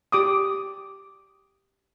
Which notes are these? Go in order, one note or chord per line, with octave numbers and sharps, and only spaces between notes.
G4 D6 D#6